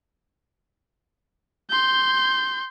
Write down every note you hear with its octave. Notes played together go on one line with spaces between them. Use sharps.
C6 G6